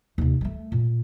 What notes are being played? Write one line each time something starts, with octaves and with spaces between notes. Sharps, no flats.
D#2 C3
G#3 A3
A#2